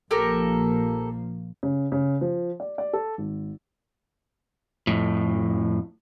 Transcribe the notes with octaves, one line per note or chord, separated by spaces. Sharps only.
A#1 F3 A#3 G4 A4 A#4
C#3
C#3
F3
D5
D5
A4
G#1
F2 A2